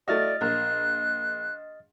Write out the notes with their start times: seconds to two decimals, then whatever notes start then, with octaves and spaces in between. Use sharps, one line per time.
0.08 A3 E4 F#4 D5 D#5 F6 A6
0.41 A#1 A#4 F#6